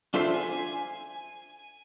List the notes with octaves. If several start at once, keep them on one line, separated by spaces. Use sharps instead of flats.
D4 F4 A4 C5 E5
G#5